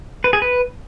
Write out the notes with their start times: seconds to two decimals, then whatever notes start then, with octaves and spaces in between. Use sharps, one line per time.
0.24 B4
0.33 G#4
0.42 B4